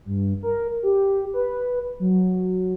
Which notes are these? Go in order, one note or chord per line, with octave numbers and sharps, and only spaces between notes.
G2
A#4
G4
B4
F#3